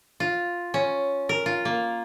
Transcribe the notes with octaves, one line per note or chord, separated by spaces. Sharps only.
F4
C#4
A#4
F4
A#3